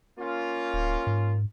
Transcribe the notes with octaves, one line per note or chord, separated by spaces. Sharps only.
A#3 C#4 F4
D1
G#2